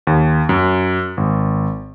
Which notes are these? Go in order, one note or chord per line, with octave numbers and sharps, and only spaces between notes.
D#2
F#2
G#1